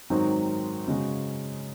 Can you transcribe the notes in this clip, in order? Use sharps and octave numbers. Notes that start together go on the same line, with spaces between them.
G#2 D#3 F#3 C4 D#4
C#3 G#3 C#4 F#4